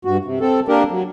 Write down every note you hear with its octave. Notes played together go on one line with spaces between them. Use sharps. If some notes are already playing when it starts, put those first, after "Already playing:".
G2 F#4
C3
C4 A4
A#3 D4 G4 A#4
F#3